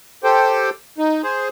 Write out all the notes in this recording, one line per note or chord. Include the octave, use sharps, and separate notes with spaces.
G4 A4 C5 G5
D#4
G#4 C5